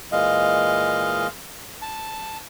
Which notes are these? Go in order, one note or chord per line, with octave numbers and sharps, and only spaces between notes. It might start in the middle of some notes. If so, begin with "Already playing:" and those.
A#2 E3 G#3 D#5 F5
A5